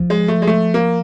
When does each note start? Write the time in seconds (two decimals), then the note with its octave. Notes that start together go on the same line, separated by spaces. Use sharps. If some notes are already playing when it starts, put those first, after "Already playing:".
Already playing: F3
0.10 G#3
0.28 A3
0.42 G#3
0.47 A3
0.74 A#3